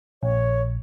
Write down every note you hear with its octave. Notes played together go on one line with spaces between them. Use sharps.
A#1 C#5